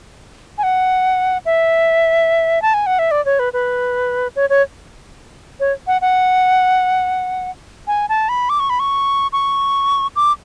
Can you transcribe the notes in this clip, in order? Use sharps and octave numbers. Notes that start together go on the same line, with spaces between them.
G#5
F#5
E5
A5
G#5
F#5
E5
D5
C#5
B4
B4
C#5
C#5
C#5
F#5
F#5
G#5
A5
B5
D6
C#6
B5
C#6
C#6
D6